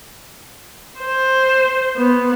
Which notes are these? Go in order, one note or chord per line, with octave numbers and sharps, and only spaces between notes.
C5
B3